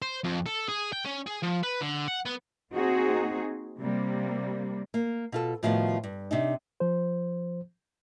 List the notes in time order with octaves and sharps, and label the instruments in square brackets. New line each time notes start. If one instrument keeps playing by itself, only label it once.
[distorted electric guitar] C5
F2
A4
G#4
G5
C#4
G#4
F3
B4
D3
F#5
B3
[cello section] A#3 C4 D#4 F#4 G#4
C3 G3 A#3
[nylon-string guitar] A#3
B2 F4 A4
A2 D#3 F3 B3 F#4 F5
G2
C3 D4 D#4
[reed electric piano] F3 C5